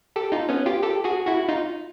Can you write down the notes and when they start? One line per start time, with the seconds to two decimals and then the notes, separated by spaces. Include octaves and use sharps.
0.16 G4 A4
0.32 D#4 F4
0.49 B3 C#4
0.66 F4 G4
0.83 G4 A4
1.04 F#4 G#4
1.27 E4 F#4
1.49 D#4 F4